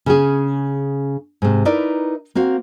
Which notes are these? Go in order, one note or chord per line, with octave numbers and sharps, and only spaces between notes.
C#3 C#4 G#4
G#2 C3
D#4 E4 A#4 B4 D5
A#3 C4 F#4 F5